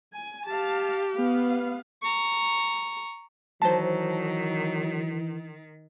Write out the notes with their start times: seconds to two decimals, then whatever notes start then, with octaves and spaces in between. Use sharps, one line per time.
0.14 G#5
0.48 G4 F5 A5
1.15 B3 F5
2.02 A#5 C#6
3.62 D#3 E3 F#3 C5 A5